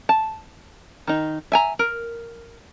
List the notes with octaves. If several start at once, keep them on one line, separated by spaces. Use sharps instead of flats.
A5
D#3 D#4
E5 G#5 A#5
A#4